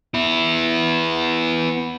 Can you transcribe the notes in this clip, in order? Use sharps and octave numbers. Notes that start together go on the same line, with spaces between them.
B3 E4